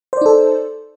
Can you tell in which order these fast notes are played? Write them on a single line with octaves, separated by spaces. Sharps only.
C5 D5 D#4 A4